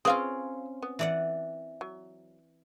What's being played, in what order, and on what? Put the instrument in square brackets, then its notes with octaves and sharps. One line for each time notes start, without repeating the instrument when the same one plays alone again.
[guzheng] C4 C#4 F4 [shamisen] G#4 B4 F5
[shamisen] B3
[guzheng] E3 D5 F#5
[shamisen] F#3